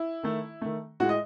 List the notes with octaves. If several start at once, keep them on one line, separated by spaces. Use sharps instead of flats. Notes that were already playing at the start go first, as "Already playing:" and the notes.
Already playing: E4
D#3 A3
D#3 A3
A2 G#3 F#4
D#5